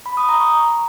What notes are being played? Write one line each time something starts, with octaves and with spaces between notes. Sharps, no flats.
B5
D#6
A#5
C#6